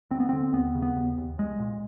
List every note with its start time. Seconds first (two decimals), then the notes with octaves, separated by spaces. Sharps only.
0.11 D2 C4
0.20 B3
0.29 D3 C4
0.53 D#2 B3
0.75 C#3
0.82 B3
0.96 D#2
1.18 D#2
1.38 C2 G#3
1.59 A#2